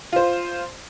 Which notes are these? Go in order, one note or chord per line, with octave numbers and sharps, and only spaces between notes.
F4 C5